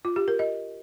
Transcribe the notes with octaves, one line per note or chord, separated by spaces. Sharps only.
F4
G4
A#4
D#5